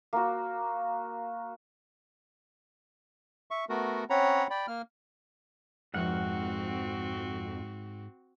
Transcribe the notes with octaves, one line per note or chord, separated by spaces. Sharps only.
A#3 F#4
E5 C#6
A3 B3 F#4 A#4
C4 C#4 C#5 F#5 A#5 B5
D5 G5 B5
A#3 F6
F2 G#2 F3 G#3 C4 F#4 F#5 F6